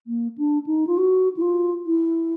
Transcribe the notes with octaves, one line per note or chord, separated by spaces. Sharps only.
A#3
D4
D#4
F4
F#4
E4
F4
E4